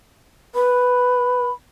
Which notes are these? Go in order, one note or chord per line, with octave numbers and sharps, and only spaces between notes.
B4 B5